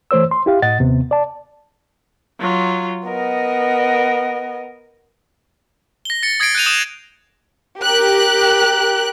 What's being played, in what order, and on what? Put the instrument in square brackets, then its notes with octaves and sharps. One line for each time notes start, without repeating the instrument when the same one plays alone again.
[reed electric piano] E3 A3 C5 C#5 E6
C6
E4 G4 F5
A2 D#5 F#5 A6
D#2 C3 B3
D5 A5
[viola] F#3 F4
[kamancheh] B3 D#5 [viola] A#4
[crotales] A#6 G7
A6 C#7
D#6 G#6 A#6 C7 D7
F#6 G6 D#7 F7
D#6 E7
[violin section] G4 A#4 F#6